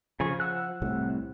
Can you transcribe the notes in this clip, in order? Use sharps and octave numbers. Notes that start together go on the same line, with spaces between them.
C#3 F3 G#4 C#6
F#5 E6 F#6
C2 A2 C3